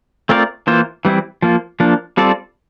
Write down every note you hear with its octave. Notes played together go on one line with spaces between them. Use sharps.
A3 C4 F4 A#4 D5
E3 A#3 F4 C5
E3 G3 C4 E4
F3 A#3 F4
F3 A#3 D4
G3 C4 F4 A4 D5